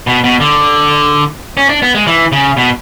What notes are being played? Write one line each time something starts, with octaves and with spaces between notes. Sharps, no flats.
B2
B2
D3
C#4
D4
B3
G#3
E3
C#3
B2